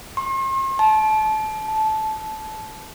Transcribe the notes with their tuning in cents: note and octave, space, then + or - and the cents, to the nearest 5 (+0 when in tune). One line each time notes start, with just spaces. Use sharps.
C6 +45
A5 -25
A5 -15